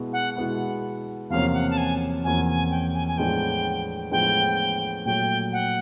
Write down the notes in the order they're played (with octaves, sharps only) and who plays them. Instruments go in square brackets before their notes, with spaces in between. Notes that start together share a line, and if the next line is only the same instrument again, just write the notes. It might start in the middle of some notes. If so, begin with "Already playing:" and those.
Already playing: [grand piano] B2 G#3 B3 E4
[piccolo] F#5
[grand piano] B2 G#3 B3 E4
[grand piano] E2 C3 F3 A#3 C#4 [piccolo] F5
[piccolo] F#5
A5
G#5
[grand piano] E2 C3 F3 A#3 C#4 [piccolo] G#5
[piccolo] G#5
G5
G#5
G#5
[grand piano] A2 F3 G#3 B3 D4 [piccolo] G5
[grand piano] A2 F3 G#3 B3 D4 [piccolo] G5
[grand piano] A#2 F#3 A3 [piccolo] G5
[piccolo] F#5